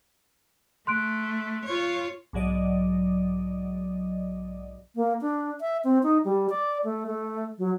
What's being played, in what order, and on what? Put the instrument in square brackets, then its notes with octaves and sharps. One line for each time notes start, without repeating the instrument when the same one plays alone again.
[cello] A3 [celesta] C6 F#6 D7
[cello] F4 C#5
[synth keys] B1 G#2 F#3 D5 D#5
[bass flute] A#3
D4
E5
C4
D#4
G3
D5
A3
A3
F#3